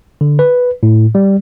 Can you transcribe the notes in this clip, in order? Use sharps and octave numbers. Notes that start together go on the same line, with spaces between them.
D3
B4
A2
G3